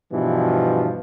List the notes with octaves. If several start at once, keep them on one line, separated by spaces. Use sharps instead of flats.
G2 B2 E3 F3